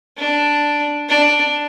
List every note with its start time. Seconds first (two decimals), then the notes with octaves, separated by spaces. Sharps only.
0.17 D4
1.09 D4